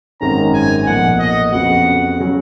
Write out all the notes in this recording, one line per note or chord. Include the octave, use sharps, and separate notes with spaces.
G#1 F#2 D#3 G#3 C#4 A#5
G#5
B1 A#2 F3 F#5
D#5
F2 C#3 F3 B3 F#4 F#5
C#3 F#3 C#4